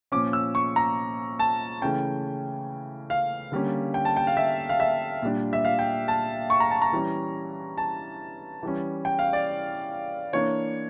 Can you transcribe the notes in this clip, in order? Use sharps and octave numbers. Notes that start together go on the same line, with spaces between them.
A#2 F3 C#4 D6
E6
C#6
A#5
A5
C#3 E3 A3 C#4 G5
F5
D3 G3 A#3 C#4
G5
A5
G5
F5
E5
F5
E5
A#2 G3 D4
E5
F5
G5
A5
C#6
A#5
A5
A#5
E3 G3 C#4
A5
E3 G3 C#4
G5
F5
D5
E3 A#3 D4 C#5